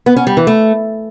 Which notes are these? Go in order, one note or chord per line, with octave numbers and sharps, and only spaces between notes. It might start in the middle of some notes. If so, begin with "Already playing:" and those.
B3
C#4
G3
E3
A3